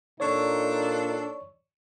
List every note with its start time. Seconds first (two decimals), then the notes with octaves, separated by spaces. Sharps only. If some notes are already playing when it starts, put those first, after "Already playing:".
0.20 A#2 D4 D#4 A4 C#5 D5 C#6